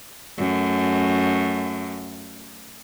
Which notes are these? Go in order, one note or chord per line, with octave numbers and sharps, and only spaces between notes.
F#2 A3